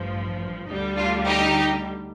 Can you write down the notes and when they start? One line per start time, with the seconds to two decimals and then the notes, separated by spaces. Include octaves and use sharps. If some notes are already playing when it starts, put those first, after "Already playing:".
Already playing: A1 G2 F3
0.68 D2 D3 G3 D#4
0.97 D4 F4
1.26 D#4 G4